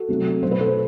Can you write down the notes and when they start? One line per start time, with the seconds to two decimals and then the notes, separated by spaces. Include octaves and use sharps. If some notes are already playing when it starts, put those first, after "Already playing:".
Already playing: F#4 A4
0.08 C3 F#3 A3
0.43 B2 F#3 A3 C5
0.51 B4
0.60 A4 C5